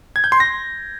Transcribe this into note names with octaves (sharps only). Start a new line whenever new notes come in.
G#6
G6
C6
A#6